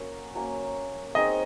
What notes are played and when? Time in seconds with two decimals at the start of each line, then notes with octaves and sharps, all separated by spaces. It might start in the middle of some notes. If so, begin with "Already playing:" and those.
Already playing: A#3 C#4 F#4 A#4
0.35 F#3 A#3 C#4
1.15 C4 D#4 G#4 C#5 D#5